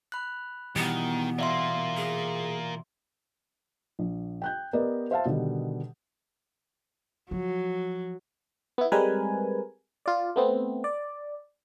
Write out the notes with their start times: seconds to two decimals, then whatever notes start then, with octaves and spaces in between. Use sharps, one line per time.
0.12 B5 F#6
0.76 B2 D#3 E3 G3 B3
1.39 A#3 F4 D5 E5 C6
1.97 G#4
3.99 A#1
4.42 G5 F#6 G6
4.73 B3 G4 A#4 B4 D5 D#5
5.11 C5 E5 F5 A5
5.25 B2 D3 D#3 G3
7.31 F3 F#3
8.78 B3 E4
8.92 G3 G#3 C4 A#4 B4 G#5
10.06 F4 D5
10.36 A3 B3 C4
10.84 D5